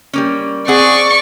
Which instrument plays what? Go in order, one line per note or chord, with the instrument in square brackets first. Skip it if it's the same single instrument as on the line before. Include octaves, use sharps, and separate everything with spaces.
[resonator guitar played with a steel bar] G3 A#3 C#4
[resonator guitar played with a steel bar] C4 F#5 [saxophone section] G#4 [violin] D5 C#6